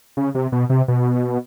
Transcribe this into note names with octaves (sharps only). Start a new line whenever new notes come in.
C#3
C3
B2
C3
B2